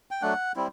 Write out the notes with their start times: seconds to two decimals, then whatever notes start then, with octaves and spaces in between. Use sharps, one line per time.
0.11 G5
0.22 F#3 A3 D4 F#5
0.56 G3 C4 E4